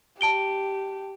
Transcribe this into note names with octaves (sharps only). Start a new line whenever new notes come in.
G4 A5 D7 G7